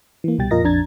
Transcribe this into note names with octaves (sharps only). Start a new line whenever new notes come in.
E3 A#3
C2 B2 G3 G5 A6
F2 A#2 F4 A#4 D#5 A#6
A#1 F2 D4 A#5 G#6 A6